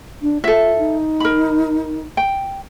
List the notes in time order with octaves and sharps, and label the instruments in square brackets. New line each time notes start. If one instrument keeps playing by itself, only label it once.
[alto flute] D4
[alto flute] F4 [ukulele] A4 E5
[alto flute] D#4
[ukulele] A#4 B5
G5